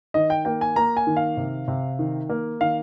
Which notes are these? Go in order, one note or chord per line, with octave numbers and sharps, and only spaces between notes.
D#3 D#5
G5
A#3 G5
G#5
A#3 A#5
G#5
D#3
F5
C3
C3
D#3
A#3
D#3 F5